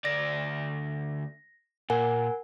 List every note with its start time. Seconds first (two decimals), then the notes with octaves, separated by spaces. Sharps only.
0.05 D2 D5 A#6
1.90 A#2 A#4 F#5 G#5